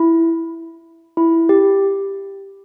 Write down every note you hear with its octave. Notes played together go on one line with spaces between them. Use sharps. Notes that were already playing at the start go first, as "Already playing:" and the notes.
Already playing: E4
E4
G4